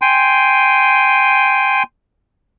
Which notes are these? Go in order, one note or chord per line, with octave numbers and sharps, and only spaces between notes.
G5 G#5 C6